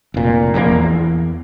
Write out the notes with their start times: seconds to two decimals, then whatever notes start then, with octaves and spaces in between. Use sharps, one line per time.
0.14 F1 A#2
0.54 D#1 A#1 B2 A#3
0.71 E2